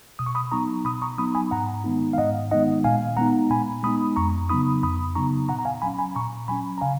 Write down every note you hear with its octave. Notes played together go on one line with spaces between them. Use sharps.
B2 D#6
C#6
B5 D#6
F#3 B3 D#4 A#5 C#6
B2 B5 D#6
A#5 C#6
F#3 B3 D#4 B5 D#6
G#5 B5
G#2 F#5 A#5
D#3 G#3 B3 D#4
F5
G#2 D#5 F#5
D#3 G#3 B3 D#4 D#5 F#5
A#2 F5 G#5
G#3 B3 D#4 F#5 A#5
A#2 G#5 B5
G#3 B3 D#4 B5 D#6
F2 A#5 C#6
C#3 F#3 B3 D#4 B5 D#6
F2 B5 D#6
C#3 F#3 B3 D#4 A#5 C#6
A#2 F#5 A#5
A#5
F5 G#5
F#3 C#4 G#5 B5
G#5 B5
A#2 A#5 C#6
F#3 C#4 G#5 B5
A#5
C#3 F5 G#5